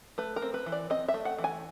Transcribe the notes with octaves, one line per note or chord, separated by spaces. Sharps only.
A3 B4
A#4
C4
B4
E3
D5
C4 D#5
E5
A3
F#5
E3
G#5